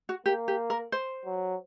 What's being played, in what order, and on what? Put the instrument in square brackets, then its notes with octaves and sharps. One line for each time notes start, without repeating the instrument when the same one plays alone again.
[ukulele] F#4
[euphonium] A#3 [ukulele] G4
[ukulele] G4
A#4
C5
[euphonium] F#3